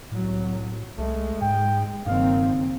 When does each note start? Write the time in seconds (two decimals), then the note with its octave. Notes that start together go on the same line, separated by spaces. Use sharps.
0.12 C2 A2 F#3
0.98 C2 G#3 A3
1.42 G#2 G5
2.07 F#1 G2 D#3 C4 F5